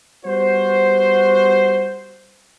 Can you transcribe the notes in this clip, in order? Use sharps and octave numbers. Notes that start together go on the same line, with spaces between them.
G3 B3 F#4 C5